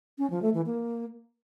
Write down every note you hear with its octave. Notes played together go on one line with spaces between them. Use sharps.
C#4
F3
A3
E3
A#3